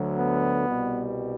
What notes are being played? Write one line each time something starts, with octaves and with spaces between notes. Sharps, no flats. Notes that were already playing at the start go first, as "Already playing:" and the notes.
Already playing: D2 D3 F#3
B3
C2 B2 G3